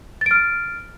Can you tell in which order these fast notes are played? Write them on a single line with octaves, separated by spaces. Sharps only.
A6 D7 F6